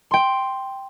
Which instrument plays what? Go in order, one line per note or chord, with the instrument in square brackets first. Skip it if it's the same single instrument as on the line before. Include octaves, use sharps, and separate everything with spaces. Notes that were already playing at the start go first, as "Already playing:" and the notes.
[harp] G5 C6